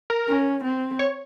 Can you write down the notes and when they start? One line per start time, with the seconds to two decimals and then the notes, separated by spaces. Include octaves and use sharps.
0.10 A#4
0.28 C#4
0.64 C4
0.99 C#5